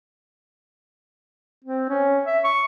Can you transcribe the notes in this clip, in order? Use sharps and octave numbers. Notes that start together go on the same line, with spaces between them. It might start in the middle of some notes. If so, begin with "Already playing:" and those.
C4
C#4
E5
C#6